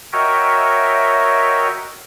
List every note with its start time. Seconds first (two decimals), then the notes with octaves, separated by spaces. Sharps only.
0.13 F#4 A#4 C#5 D#5 E5 G5